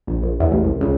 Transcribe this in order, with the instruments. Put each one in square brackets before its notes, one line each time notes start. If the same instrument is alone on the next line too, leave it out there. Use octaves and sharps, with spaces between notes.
[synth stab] A#1
A#1
E2
A1
C2
C#2